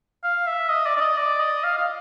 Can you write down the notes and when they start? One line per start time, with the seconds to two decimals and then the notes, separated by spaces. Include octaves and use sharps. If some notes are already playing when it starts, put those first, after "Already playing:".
0.23 F5
0.47 E5
0.69 D#5
0.86 D5
0.97 D5
1.01 D#5
1.17 D5
1.40 D#5
1.63 F5
1.78 F5